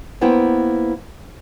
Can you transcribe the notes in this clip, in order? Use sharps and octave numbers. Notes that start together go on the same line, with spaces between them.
A#3 B3 E4 C5 G5